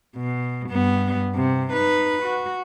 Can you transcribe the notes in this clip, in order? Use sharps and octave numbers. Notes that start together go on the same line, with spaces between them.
B2
G2 B3
C3
D#4 B4
F#4